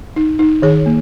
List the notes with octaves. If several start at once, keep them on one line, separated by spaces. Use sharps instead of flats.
D#4
D#4
D#3 G#4 C#5
A#3